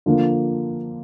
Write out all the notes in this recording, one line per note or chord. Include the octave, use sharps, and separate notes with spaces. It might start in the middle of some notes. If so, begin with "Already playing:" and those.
D3 F3 A#3